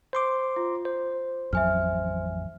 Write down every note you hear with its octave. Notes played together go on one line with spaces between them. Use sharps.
C5 C6 D6
F4
C5
A1 F2 F#3 E5 G#5 F6